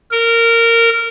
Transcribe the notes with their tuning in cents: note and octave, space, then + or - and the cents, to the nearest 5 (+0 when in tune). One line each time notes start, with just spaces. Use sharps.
A#4 -15